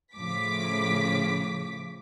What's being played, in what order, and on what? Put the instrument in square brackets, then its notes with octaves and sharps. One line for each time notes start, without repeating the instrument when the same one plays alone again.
[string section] A2 C#3 F3 D6 B6